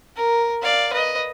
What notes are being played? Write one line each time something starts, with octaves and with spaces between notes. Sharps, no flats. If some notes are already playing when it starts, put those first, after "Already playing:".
A#4
D5 F5
B4 D#5